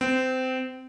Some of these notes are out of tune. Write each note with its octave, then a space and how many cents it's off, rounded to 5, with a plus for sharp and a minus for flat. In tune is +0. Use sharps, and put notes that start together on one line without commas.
C4 -20